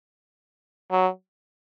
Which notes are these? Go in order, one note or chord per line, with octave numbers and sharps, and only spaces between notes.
F#3